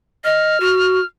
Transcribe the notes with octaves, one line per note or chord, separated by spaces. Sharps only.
D#5 F6
F#4